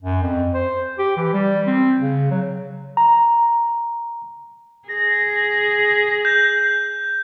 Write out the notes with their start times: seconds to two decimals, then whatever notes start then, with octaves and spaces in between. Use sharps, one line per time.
0.02 F#2
0.22 F2
0.54 C5
0.98 G4
1.17 E3
1.33 G3
1.67 C4
2.00 C#3
2.31 F#3
2.97 A#5
4.88 G#4 A#6
6.25 G6